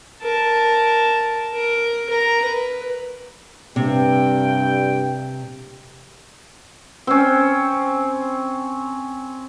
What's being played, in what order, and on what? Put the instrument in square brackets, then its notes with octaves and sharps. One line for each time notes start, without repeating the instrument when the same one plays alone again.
[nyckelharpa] A#4 A5
A#4
A#4 A#5
B4
[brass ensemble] G2 G5 [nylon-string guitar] C3
[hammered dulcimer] C4 C#4